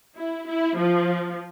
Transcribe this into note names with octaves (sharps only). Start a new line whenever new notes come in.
E4
E4
F3